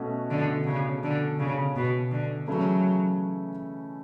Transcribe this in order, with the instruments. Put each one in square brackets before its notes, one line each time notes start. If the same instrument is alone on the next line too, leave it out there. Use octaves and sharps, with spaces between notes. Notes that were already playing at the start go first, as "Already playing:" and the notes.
Already playing: [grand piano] B2 A3 C#4 F#4
[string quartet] D3
C#3
D3
C#3
B2
D3
[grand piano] C#3 E3 A3 C#4 E4 [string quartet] F#3